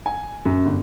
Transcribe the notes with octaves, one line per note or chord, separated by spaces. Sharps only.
G#5
F#2
G1